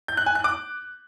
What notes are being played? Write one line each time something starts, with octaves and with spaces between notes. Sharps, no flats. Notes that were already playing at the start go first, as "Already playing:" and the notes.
G6
F#6
G#5
F#6
D6